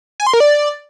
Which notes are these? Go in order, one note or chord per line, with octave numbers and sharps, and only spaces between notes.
G#5
C6
A#4
D5